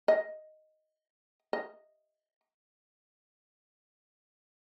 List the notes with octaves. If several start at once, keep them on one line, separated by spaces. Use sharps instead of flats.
D#5
D#5